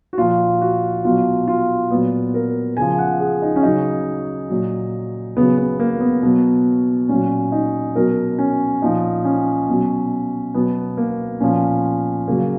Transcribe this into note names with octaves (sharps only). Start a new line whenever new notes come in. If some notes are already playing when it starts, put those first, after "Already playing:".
F#4
A#2 F3 F4
F#4
B2 F#3 F4
F4
A#2 F#3 B3
A#4
C#3 F3 G#5
F#5
G#4
D#4
C#4
C#3 F#3 D#4
A#2 F#3
C#3 F#3 B3
B3
A#3
B3
B2 F#3
A#2 F#3 C#4
D#4
B2 F#3 A#4
C#4
A#2 F3 D#4
C#4
B2 F#3
B2 F#3 B3
A#3
A#2 F3 C#4
C#3 F#3 A#3